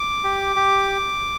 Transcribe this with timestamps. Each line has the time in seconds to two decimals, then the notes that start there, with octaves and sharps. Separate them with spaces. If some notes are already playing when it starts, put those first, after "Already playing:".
Already playing: D6
0.24 G4
0.56 G4